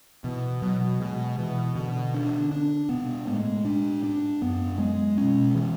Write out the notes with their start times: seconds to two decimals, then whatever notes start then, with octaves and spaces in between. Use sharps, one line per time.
0.24 B2 E3
0.62 B2 F#3
1.00 B2 G#3
1.38 B2 E3
1.76 B2 D3
2.14 D3 D4
2.51 D4
2.89 B2 B3
3.27 A2 G#3
3.65 D4
4.04 G#2 D4
4.42 F#2 B3
4.79 F#2 G#3
5.18 B2 C#4
5.55 E3